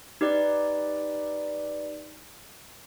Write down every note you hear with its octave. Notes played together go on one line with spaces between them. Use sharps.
D#4 G4 B4 D5